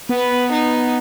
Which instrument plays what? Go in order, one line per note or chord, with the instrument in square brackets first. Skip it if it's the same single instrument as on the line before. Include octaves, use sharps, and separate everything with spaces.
[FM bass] B3 [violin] B4
[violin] D#4